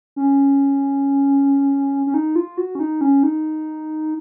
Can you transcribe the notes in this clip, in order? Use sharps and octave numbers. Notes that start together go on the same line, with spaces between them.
C#4
C#4
D#4
F4
F#4
C#4
D#4
C#4
D#4